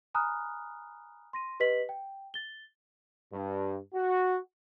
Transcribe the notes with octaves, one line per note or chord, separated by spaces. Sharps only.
G#5 A#5 B5 D#6 F6 F#6
C6 A#6 D#7
G4 B4 D#5 B6 F#7
G5
A6 G7
G2
F#4